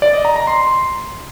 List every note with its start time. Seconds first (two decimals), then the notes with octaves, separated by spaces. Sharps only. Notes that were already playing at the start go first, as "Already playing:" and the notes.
0.02 D5
0.13 D#5
0.25 A#5
0.36 A#5
0.47 C6